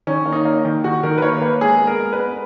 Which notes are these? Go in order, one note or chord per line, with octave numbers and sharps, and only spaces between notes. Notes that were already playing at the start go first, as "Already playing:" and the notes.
D#3 C#4
A#3
D#4
A#3
D#3
D#3 F#4
D#3 A#4
B4
A#3 C#5
A#3 B4
G#3 G#4
B3
A#4
G#3
B4
B3